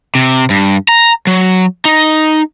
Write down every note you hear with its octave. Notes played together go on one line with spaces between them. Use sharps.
C3
G2
A#5
F#3
D#4